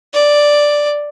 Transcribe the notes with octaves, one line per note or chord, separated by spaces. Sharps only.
D5